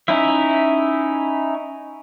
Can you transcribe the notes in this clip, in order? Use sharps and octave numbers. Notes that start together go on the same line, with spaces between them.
C#4 D#4 E4 E5